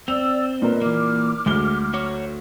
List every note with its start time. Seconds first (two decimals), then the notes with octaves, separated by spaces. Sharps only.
0.08 C4 D5 E6 F7
0.62 A#2 A#4 B4 D#5
0.81 E3 A#3 D6 F6
1.46 D2 G#3 G7
1.94 F#4 C#5